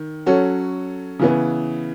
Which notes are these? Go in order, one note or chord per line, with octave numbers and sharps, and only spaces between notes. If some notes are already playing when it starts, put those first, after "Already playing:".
Already playing: D#3
F#3 C#4 F#4 A4
C#3 E3 B3